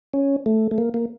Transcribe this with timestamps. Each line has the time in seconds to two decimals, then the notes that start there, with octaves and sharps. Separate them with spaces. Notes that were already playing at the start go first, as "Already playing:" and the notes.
0.14 C#4
0.46 A3
0.71 A3
0.78 A#3
0.94 A#3